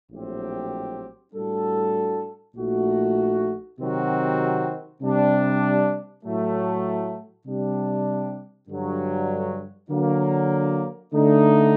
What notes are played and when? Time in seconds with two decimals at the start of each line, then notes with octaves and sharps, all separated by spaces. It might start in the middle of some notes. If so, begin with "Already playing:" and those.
0.11 A#1 A2 F#3 C4 G4
1.33 A2 G3 D4 F#4 A4
2.56 A#1 A#2 A3 D#4 F#4
3.78 C3 D#3 F#3 C4 F#4
5.01 C3 G3 D4
6.24 A2 F#3 A3
7.46 C3 G3 D4
8.69 G2 D3 F#3
9.90 D3 F#3 A#3
11.13 D3 A3 D#4